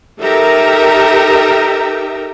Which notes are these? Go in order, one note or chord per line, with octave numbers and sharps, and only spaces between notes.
D#4 G4 A4 A#4 E5 A#5